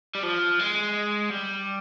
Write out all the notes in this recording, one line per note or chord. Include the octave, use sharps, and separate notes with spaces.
G3
F3
G#3
G3